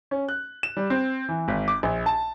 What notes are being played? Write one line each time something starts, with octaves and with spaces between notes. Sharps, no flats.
C#4
F#6
E7
G3
C4
E3
G#1
D6
A#1
A5